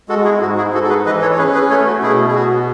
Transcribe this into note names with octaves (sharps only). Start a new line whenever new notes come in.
G#3 F#4 A4
E4 G#4
G#2 F#4
E4 G#4
G#2 F#4 A4
A4
G#4 B4
E3 B4 D#5
A4 C#5
C#5
C#4 G#4 B4
G#4 B4
A3 A4 C#5
F#4
B2 E4 G#4
G#4
B2 F#4